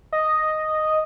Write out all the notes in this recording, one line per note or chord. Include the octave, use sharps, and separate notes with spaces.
D#5